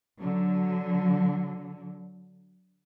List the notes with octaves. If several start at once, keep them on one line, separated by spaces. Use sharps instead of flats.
D3 F#3